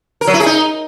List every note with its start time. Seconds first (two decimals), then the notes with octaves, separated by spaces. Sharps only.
0.21 A#4
0.27 F#3
0.34 E4
0.40 G#4
0.46 D#4